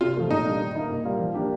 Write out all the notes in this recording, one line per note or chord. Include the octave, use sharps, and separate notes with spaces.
C3 F4
F3 A3
A#2 D#4
G3 D4
D#3
A#3 D#4
A#2
G3 A#3 F4
F3
A#3 D4 G4